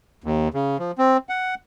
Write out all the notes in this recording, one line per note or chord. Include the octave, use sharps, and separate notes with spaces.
D#2
C#3
F3
C4
F#5